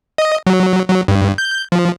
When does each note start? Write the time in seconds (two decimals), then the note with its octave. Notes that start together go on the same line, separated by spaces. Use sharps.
0.18 D#5
0.47 F#3
0.88 F#3
1.08 G2
1.38 G6
1.72 F3